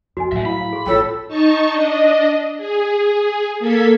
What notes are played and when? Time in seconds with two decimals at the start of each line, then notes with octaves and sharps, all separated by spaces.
0.17 F2 F#4 D#5 G#5
0.32 A2 F#3 E5 F#5
0.45 E4 F5 B5
0.61 F5
0.73 G#4 C6
0.86 A1 A3 F4 A4 C#5 G5
1.28 D#4 A5 C#6 C#7
1.71 D4 D#5
2.58 G#4
3.59 A#3 A4 G#6 B6